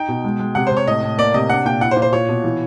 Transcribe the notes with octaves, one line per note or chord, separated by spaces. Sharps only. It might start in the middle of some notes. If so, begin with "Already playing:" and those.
Already playing: D#4 G5
B2
G#3
G#3
C3 F#5
C3 C5
C#5
A2 D#5
A2
A#3 D5
C3 D#5
D4 F#5
A#2 G5
E4 F#5
C5
A#2
C5
F4 C#5
B2
E3